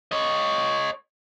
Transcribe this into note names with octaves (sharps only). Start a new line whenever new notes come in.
C#5 D#5